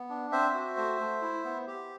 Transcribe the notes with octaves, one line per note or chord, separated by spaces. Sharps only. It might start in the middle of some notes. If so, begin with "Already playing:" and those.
Already playing: B3
D4
C4 C5 E5
F#4
A3
A3
E4
B3
G4